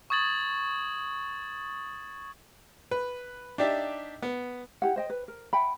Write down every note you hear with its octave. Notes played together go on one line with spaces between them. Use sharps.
C#6 D#6 G#6 A6 F#7
B4
D4 D#4 G4 D5 E5
B3
E4 G4 F#5
C5 D#5 G5
B4
A#4
E5 F#5 G5 B5